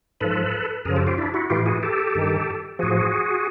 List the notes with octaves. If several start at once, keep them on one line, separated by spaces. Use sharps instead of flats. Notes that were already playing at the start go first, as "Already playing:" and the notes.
G#2 F3 A4 B4
F#2 C#3 F3 G#4 A#4
G4 A4
F4 G4
D4 E4
E4 F#4
A2 E3 F4 G4
F#4 G#4
G4 A4
G2 D#3
A2 F3 F#4 G#4